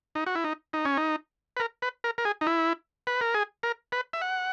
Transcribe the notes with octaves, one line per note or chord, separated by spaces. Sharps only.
D#4
F#4
E4
D#4
D#4
C#4
D#4
B4
A#4
B4
A#4
A#4
G#4
D#4
E4
B4
A#4
G#4
A#4
B4
E5
F#5